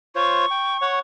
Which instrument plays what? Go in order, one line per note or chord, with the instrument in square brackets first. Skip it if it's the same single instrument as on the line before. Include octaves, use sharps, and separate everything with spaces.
[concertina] F4 C5 C#5 [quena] C#6
[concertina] G5
C#5 F#5